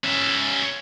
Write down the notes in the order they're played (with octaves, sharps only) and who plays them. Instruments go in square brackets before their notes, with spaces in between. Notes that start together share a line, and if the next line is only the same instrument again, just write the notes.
[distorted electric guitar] C#4 E5